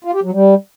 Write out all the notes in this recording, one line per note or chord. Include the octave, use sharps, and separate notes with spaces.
F4
G4
F#3
G3